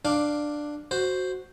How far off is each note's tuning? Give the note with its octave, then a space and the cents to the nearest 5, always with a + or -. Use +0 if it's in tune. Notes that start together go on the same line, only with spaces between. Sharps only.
D4 +10 F5 +0 D6 +0
F#4 +0 C5 +0